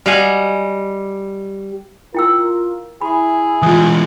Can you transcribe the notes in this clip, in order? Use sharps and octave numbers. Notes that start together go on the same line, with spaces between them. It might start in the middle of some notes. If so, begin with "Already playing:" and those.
G3 D#5 F5 F#5 G#5
E4 F4 A#4 G5 E6
E4 G#4 B5
E3 G#3 F4 D#6